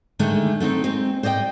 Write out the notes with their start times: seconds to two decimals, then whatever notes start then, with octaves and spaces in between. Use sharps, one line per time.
0.19 D3 D#3 G#3 A3 D4
0.60 A3 B3 C4 D#4
0.84 G#3 C4
1.23 C5 D5 D#5 F5 G5